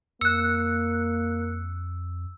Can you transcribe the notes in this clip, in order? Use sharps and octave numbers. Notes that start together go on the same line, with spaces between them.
F2 A#3 E6 F#6 C#7